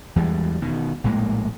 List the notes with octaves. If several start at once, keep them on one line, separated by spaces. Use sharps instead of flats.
E2 E3 G3 G#3
B2 D#3
A#1 A2 G#3 A#3